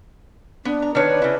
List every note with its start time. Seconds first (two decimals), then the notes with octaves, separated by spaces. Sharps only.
0.65 B3 D4
0.82 A#5
0.95 D#3 D4 B4 C#5
1.22 C#3 E4